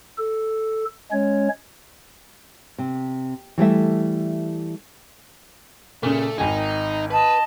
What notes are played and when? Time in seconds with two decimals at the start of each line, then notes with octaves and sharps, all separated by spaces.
0.18 A4
1.12 G#3 C#4 C#5
2.78 C3
3.58 E3 G3 A3 E5
6.03 A#2 C#3 A3
6.38 G#1 D#3 D#4 G#5
7.11 B4 D#5 A5